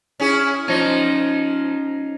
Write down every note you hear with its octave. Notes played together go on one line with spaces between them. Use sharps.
C#4 E4 G#4
F3 C#4 D#4